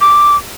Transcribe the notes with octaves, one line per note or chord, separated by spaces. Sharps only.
D6